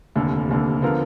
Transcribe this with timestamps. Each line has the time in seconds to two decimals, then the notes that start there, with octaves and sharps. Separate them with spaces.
0.15 F1 D#2 D3
0.49 F1 D#2 D3
0.82 D3 F3 B3 F4 A#4